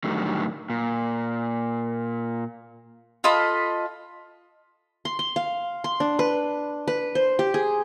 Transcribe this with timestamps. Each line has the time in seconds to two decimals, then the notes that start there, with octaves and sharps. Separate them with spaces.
0.04 A2 D3 D#3 F#3 G3 A3
0.70 A#2
3.24 F4 A4 D#5 B5
5.05 C6
5.19 C6
5.36 F5
5.84 C6
6.00 D4
6.19 B4
6.88 B4
7.15 C5
7.39 G4
7.54 G#4